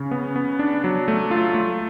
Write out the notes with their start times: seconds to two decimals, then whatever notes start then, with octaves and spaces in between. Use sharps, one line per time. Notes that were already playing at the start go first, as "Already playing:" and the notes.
Already playing: C#3
0.11 B3
0.36 B3
0.59 D4
0.84 F#3
1.08 A3
1.31 F4
1.54 A3